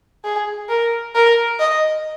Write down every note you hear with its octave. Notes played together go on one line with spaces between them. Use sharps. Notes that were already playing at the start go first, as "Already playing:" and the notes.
G#4
A#4
A#4
D#5